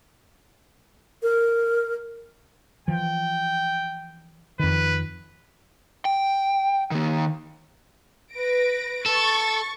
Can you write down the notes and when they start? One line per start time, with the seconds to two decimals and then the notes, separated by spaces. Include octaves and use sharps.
1.23 A#4
2.88 E3 F3 G5
4.59 F2 D#3 B4
6.05 G5
6.91 D#3 A#3
8.32 B4 A#6 D7
9.06 A4 C#6 A6